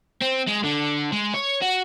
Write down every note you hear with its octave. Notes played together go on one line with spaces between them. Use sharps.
C4
G#3
D3
G#3
C#5
F#4